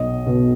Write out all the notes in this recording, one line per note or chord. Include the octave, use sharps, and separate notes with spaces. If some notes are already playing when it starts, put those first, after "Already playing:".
Already playing: B1 D#5
B2